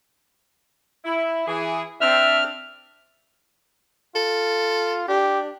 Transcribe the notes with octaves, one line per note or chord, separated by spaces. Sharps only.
E4
E3 G#4
C4 D4 E5 F6
F4 A4
D4 G4